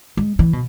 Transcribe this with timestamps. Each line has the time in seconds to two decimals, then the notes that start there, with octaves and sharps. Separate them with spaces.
0.17 G#3
0.39 E3
0.53 B2